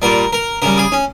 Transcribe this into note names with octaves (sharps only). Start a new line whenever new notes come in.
A#2 G3 A#4
A#4
C#3 G3 A#4
G#4
C#4